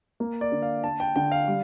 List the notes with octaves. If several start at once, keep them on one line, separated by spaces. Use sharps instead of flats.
A#3
D5
D3
F5
D4 A5
G5
D3 G5
F5
G3